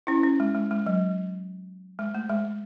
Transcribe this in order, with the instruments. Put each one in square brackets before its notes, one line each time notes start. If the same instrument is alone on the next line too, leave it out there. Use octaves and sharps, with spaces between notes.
[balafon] C#4 E4
C#4
G#3
G#3
G#3
F#3
G#3
A3
G#3